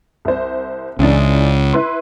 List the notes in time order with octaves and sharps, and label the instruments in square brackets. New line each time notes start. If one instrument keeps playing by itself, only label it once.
[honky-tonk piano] C2 C5
[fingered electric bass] C#2 [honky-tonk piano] C#3 E3 D4
[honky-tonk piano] E4 B4 C6